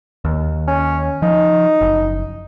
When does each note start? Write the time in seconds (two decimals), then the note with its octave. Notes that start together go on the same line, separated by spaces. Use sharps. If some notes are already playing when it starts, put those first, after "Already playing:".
0.25 D#2
0.67 C#4
1.22 F3 D#4
1.81 F#1